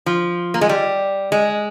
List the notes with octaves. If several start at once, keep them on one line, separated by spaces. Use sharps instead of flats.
F3
A#3
G#3
G3
G#3